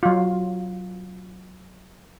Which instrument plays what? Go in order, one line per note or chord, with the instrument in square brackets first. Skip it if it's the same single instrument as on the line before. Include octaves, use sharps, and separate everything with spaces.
[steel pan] F#3 F4